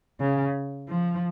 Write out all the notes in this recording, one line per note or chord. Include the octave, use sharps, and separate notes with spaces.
C#3
F3